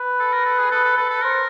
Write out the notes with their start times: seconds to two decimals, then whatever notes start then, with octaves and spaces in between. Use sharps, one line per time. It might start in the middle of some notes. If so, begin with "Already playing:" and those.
Already playing: B4
0.20 A4
0.33 A#4
0.45 A4
0.59 G#4
0.71 A4 B4
0.84 A4
0.97 A4 B4
1.10 A4
1.22 A#4 C5